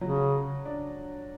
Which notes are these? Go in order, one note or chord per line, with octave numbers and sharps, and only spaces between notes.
C#3 F#3
D4